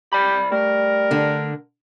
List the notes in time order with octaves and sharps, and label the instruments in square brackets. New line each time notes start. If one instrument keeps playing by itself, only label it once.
[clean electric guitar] C2 D5 B5 [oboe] G4
[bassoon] G3 [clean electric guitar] A3 [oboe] A#4
[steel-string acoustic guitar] D3 D4